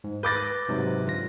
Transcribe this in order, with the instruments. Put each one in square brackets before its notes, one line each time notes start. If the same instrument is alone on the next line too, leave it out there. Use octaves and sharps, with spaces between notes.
[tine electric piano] G#2
[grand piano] B4 D6 A6 [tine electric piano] G6 A#6
[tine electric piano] G#2 C3 F#3
D3 F4 A#6